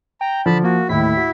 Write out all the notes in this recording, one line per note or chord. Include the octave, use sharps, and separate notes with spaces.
G5 A#5
D3 F3 A5 B5
A#3 F#4
D#2 A2 E4 B6
F#4